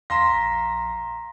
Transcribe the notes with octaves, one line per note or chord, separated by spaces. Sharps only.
E2 F5 A#5 C6 A#6 B6
A#1